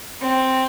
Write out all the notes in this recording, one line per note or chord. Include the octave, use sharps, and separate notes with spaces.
C4